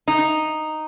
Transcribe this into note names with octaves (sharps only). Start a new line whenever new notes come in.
D#4